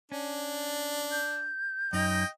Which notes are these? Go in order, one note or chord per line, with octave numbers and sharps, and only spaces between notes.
C#4 D4
G6
F#2 D#4 D#5 G5